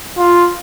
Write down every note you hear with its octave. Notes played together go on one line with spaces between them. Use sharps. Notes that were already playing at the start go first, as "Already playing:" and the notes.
F4